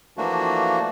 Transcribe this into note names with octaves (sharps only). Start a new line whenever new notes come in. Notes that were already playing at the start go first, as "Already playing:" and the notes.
E3 F3 A3 A#3 D4 F#4